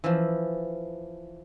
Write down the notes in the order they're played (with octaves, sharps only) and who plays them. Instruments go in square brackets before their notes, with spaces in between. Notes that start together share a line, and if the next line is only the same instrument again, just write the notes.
[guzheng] E3 F3